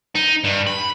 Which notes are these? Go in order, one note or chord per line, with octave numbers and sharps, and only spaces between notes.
D#4
G2
B5